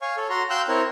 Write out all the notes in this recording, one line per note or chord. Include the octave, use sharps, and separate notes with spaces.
C#5 F5 G#5 C#6
A4 C#5
F#4 A#5 C6
F5 G5 C6 E6 F#6 G6
C4 E4 A#4 C#5